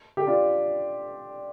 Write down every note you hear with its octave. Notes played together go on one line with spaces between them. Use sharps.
G4
D4 F4